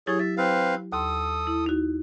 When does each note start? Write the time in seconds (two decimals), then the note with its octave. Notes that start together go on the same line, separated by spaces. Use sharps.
0.07 F#3 E4 G4 G#4 C#5
0.19 E5 A6
0.37 C4 B4 F5
0.92 D#2 A4 C6 D#6
1.47 E4
1.66 D#4 F#4